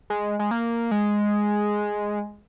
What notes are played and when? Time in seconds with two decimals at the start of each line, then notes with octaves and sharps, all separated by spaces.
0.10 G#3
0.39 G#3
0.51 A#3
0.91 G#3